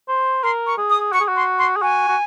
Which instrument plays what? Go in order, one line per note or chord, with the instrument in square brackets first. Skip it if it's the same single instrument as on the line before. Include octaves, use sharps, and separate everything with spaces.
[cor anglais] C5
[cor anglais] A#4 [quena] C6
[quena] C#6
[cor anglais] G#4
[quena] D#6
[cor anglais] F#4 [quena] C#6
[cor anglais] G#4
F#4
[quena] C6
C6
[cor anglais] G#4
[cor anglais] F#4 [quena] G#5
[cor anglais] F#4